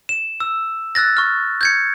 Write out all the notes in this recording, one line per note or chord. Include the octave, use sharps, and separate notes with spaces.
E7
E6
E6 F#6 A6 A#6
C#6 F6
G6 G#6 C#7